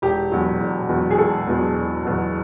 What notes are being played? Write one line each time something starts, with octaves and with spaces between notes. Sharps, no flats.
E1 G4
E2 B2 F#3
E1
E2 B2 F#3
G#4
E1 A4
E2 B2 F#3
E1
E2 B2 F#3